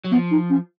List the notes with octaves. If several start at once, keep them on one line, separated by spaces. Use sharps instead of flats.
F#3
F3 B3
D#4
C#4